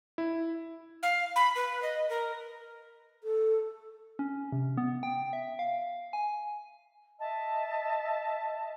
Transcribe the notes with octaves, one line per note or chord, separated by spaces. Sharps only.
E4
F5
B5
B4
D#5
A#4
A4
C#4
C3
B3
G5
E5
F5
G#5
D#5 E5 A5